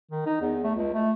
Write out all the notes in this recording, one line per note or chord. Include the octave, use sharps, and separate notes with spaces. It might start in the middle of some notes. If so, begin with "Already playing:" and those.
D#3
D#4
E2
A3
C#2
A3